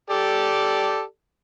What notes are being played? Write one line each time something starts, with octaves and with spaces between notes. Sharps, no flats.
G4 A4 D5